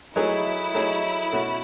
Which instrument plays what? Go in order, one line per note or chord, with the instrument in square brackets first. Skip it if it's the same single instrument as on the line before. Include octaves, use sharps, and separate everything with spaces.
[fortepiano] F#3 A3 D#4 G#4 C#5 [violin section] E4
[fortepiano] F#3 A3 D#4 G#4 C#5
B2 A3 C#4 F#4